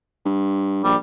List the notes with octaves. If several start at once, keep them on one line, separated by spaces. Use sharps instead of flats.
G2
A#1 G3